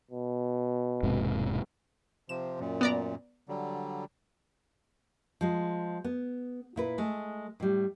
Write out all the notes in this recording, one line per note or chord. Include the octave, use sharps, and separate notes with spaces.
B2
E1 G#2 C3
C3 F3 E7
F#2 A#2
B3 D5 A#5
D3 F#3 G3
F3 G#3
B3
A#2 E4 B4
G#3 A3
A2 G3